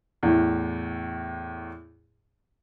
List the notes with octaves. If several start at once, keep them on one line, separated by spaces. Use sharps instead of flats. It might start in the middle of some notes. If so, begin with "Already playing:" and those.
E2 A2